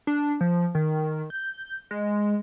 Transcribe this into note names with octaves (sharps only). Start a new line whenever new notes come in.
D4
F3
D#3
G6
G#3